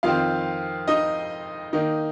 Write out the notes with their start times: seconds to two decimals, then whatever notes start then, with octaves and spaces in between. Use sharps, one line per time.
0.03 F2 D#3 C4 F4 F5
0.88 D#4 D#5
1.73 D#3 A#3 D#4